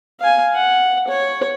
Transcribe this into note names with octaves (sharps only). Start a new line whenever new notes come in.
F5 G#5
F#5
C#5